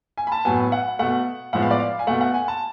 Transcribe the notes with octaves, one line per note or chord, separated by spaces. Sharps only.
G#5
B5
A5
A2 F#3 B3 G#5
F#5
B2 A3 F#5
A2 F3 G#3 B3 F#5
F5
D5
F5
G#5
B2 A3 F#5
F#5
G#5
A5